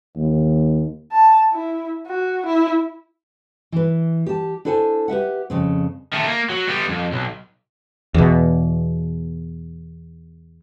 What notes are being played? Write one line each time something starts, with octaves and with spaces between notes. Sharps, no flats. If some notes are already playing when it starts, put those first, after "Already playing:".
D#2
A5
E4
F#4
E4
E3 B4
G4 A5
D4 E4 A4 C5 G#5
G4 B4 E5 F#5
F2 C#3 C4
D#3 A3
A#3
F#3
G3 B3
F2
B1
E2 B2